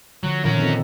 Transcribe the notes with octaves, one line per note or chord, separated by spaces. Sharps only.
D3 F3 F#3
A#2 D#3 F3 C#4 A#4
C4 D#4 A4